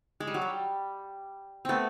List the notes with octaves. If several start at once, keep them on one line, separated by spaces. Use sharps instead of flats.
G#3
G3
F#3
G3
A3 B3 C4